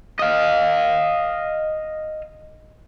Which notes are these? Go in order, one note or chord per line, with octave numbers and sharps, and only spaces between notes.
D#5 F5